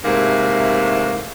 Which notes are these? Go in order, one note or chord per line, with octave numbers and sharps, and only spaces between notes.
G#2 C3 E3 A3 A#3